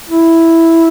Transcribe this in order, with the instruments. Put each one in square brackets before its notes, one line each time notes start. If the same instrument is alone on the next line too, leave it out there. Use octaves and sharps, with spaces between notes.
[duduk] E4